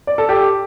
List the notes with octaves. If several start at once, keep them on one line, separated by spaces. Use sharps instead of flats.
D5
A4
G4